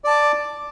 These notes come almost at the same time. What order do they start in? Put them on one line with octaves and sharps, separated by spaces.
D5 A5 D6